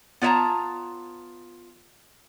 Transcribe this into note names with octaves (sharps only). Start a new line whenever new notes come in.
B3 F4 C#5 E5 A5 A#5